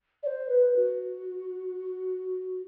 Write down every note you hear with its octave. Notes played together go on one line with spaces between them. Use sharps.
D5
C5
B4
F#4